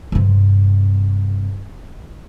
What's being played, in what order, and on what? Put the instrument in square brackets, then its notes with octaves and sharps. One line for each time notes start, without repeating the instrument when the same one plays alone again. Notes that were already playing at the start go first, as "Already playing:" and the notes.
[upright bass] G2 C3